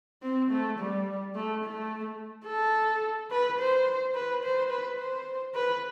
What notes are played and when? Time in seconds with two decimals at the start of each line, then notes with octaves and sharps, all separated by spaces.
0.22 C4
0.51 A3
0.79 G3
1.35 A3
1.64 A3
2.46 A4
3.31 B4
3.59 C5
4.15 B4
4.44 C5
4.71 B4
4.99 C5
5.55 B4